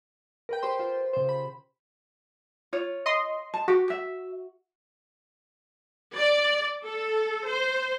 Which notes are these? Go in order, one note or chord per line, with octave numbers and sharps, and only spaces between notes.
A#4 B4 G5
G4 C5 C6
F4 C5
C#3 C5
B5
F4 C#5
D#5 C6
A5
F#4 G4
E5
D5
A4
C5